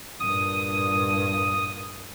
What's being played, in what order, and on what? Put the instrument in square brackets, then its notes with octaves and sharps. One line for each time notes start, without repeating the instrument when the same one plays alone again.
[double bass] G2 A#2 [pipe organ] D#6